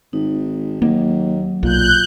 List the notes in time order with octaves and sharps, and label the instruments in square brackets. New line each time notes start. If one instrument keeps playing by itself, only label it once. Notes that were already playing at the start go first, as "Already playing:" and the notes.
[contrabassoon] G#1 [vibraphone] D#4
[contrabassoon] D#2 [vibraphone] F#3 [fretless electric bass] A#3
[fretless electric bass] B1 [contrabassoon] A#2 [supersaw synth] F#6 G6